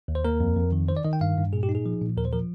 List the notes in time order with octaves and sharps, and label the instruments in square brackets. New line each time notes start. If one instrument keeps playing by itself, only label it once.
[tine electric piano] D#2
C5
A#3 A#4
F2
F2
D#3
D#3 C5
D5
D#3 D#5
G5
G2 F5
G2
A#2 G#4
G4
D#4
G#4
F3
A#2
D#2 A#4
C5
F3 A#4